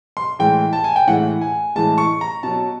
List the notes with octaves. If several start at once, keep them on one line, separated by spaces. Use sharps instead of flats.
C6
A2 E3 G#3 G5
A5
G#5
G5
A2 E3 G#3 F#5
G#5
A2 E3 G#3 A5
C#6
A#5
B2 F#3 A5